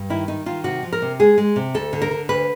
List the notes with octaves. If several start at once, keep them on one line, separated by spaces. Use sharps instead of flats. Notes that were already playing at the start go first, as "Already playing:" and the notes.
Already playing: G2
D#3 E4
D#3 D#4
D#3 F4
C3 F#4
F3
A#4
C3
G#3 G#4
G#3
C3
D2 A4
D3
A#4
D3
D2 B4